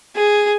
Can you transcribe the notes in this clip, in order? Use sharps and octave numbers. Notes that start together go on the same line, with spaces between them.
G#4